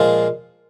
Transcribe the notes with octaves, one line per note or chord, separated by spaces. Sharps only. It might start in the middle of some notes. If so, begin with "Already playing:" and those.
Already playing: A#2 F3 G#3